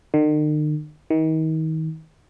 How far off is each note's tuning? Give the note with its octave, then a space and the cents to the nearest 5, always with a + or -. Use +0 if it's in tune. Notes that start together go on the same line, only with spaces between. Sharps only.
D#3 -45
D#3 +35